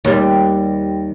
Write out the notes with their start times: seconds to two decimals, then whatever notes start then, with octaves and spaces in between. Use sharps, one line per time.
0.05 D#2 G3